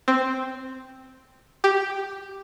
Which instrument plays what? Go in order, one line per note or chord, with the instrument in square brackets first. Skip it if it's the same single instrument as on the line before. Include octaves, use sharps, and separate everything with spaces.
[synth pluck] C4
G4